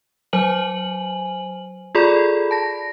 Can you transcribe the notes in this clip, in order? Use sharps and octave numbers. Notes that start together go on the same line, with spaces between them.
F#3 C5 G#5 F#7
F4 G#4 A4 D5 B5
A5 A#6